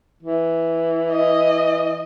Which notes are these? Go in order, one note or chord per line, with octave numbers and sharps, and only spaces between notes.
E3
D#5